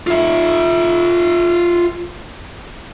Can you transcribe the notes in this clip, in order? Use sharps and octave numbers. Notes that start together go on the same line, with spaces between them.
F4 E5